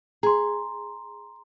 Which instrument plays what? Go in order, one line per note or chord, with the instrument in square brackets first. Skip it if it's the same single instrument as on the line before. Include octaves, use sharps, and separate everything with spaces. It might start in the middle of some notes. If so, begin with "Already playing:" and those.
[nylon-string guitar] G#4 [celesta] A#5 C6